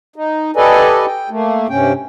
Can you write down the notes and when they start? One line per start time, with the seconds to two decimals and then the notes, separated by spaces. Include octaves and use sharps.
0.16 D#4
0.56 G4 A4 B4 D5 D#5 G#5
1.06 G5
1.30 A3 A#3
1.70 G2 C3 C#4 G5